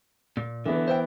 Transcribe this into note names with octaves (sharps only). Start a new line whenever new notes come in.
A#2
D3 E3 B3
C5 E5 G5